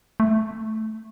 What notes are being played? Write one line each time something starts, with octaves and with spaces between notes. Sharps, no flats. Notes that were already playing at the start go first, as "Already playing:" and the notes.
A3